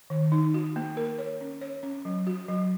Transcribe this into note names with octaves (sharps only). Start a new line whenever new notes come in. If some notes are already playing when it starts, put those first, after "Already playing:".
D#3
D#4
F#4
A#3
A#4
C#5
C#4
C#5
C#4
F#3
F#4
F#3